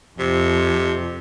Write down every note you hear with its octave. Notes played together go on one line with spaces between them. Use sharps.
F2 C3